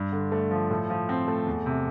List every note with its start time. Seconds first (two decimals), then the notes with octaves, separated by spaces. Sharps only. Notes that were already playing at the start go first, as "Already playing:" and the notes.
Already playing: G2
0.12 D3
0.32 A3
0.51 F3
0.70 A2
0.90 F3
1.09 C4
1.28 A3
1.47 E2
1.66 C3